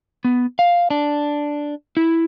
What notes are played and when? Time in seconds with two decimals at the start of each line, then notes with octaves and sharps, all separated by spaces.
0.25 B3
0.59 F5
0.90 D4
1.97 E4